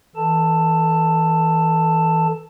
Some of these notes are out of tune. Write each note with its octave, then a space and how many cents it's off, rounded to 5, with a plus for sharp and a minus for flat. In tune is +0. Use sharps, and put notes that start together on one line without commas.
E3 -25 A4 +0 A5 +10